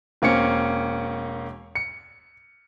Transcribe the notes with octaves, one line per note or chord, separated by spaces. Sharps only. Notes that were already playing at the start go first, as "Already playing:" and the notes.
E1 A#3 C4 C#4 C#7
C#7